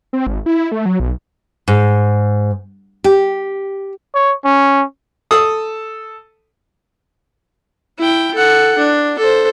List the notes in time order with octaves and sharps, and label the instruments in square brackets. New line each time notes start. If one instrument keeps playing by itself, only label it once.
[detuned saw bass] C4
G#1
E4
A3
F#3
B1
[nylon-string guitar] G#2
G4
[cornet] C#5
C#4
[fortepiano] A4 D#6
[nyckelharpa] E4 G5
A4 F#5
D4
A4 C5